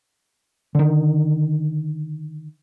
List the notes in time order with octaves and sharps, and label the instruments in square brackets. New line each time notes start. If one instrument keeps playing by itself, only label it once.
[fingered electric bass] D3 D#3